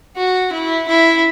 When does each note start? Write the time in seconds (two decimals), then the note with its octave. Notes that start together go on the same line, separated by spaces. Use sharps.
0.17 F#4
0.52 E4
0.88 E4